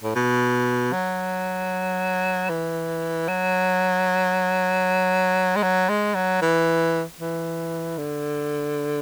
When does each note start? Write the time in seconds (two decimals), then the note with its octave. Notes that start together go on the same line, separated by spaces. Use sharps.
0.03 A2
0.15 B2
0.93 F#3
2.49 E3
3.28 F#3
5.56 G#3
5.63 F#3
5.89 G#3
6.15 F#3
6.41 E3
7.20 E3
7.98 D3